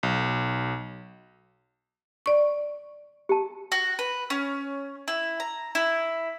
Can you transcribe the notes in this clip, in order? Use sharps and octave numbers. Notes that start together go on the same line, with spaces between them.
B1
D5 C#6
G4 A5
F#4
B4
C#4
E4
A#5
E4